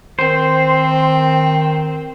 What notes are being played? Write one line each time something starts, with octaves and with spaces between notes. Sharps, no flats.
D#3 C4 C5